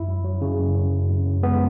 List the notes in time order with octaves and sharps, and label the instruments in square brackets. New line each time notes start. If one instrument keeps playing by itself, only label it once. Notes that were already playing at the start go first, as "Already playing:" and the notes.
Already playing: [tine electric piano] F#2 E4
F#3
F#3
C#3
F#2
F#2
F#2
F#2
F#2
G#3 B3